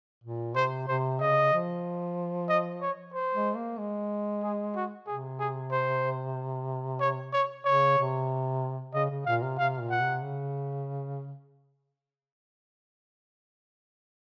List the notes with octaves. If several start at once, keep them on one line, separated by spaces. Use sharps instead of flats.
A#2
C3 C5
C3 C5
C#3 D#5
F3
D#5
C#5
C5
G#3
A#3
G#3
G#4
F#4
C3 G#4
G#4
C5
C#5
C#5
C#3 C#5
C3
C#3 D#5
C#3
A#2 F5
C3
C3 F5
A#2
F#5
C3
C#3